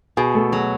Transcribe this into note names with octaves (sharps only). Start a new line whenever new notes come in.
B2 G#4
A3 A4
F#3 G#4